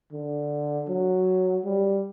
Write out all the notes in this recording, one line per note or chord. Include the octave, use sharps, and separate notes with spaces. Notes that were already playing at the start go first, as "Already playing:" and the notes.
D3
F#3
G3